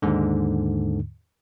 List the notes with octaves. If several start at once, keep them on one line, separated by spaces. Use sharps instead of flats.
D#2 G#2 D3